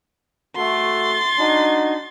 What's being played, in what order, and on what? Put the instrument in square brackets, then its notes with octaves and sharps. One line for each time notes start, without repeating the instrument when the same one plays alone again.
[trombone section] A3 F#4 A4 [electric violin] C6 A6
[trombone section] D4 D#4 F#4